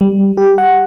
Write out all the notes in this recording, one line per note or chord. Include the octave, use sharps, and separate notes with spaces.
G3
G4
F#5